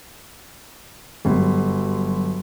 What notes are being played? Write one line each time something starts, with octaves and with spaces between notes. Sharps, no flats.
G1 F#2